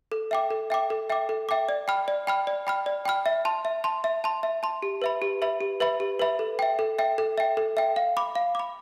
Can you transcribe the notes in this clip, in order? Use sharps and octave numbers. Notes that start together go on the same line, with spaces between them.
A4
E5 G5 D6
A4
E5 G5 D6
A4
E5 G5 D6
A4
E5 G5 D6
D5
G5 B5 F6
D5
G5 B5 F6
D5
G5 B5 F6
D5
G5 B5 F6
E5
A5 C6
E5
A5 C6
E5
A5 C6
E5
A5 C6
G4
B4 E5 B5
G4
B4 E5 B5
G4
B4 E5 B5
G4
B4 E5 B5
A4
E5 G5
A4
E5 G5
A4
E5 G5
A4
E5 G5
F5
B5 D6
F5
B5 D6